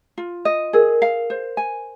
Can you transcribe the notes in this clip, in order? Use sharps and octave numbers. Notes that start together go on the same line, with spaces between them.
F4
D#5
G#4 A#4
F5
C5
G#5